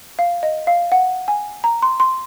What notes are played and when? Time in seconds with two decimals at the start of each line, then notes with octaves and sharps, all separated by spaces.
0.19 F5
0.43 D#5
0.67 F5
0.92 F#5
1.28 G#5
1.64 A#5
1.82 C6
2.00 C6